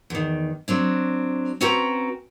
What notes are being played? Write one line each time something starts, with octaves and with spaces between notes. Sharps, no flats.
E2 D#3
F#3 C4 D4
C4 C#4 F#4 B4 G5 A#5